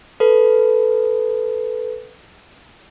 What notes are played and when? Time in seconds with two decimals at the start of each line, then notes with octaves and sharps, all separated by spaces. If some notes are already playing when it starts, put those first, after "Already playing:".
0.20 A4 B4